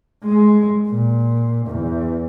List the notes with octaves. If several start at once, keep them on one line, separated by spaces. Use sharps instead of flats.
G#3
A#2
E2